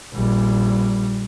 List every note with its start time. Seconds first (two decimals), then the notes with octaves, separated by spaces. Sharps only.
0.14 A#1 G3